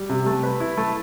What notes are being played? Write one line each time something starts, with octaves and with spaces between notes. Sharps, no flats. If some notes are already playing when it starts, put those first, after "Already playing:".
Already playing: G3
C3
A3
B4
E4
A3